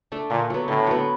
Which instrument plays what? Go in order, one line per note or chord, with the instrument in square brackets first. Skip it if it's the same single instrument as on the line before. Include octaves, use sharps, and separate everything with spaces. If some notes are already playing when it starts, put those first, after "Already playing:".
[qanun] A3 D4
[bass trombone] A#2 [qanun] D3
[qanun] F#3 B3
[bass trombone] A2 [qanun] D3
[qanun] F#3 B3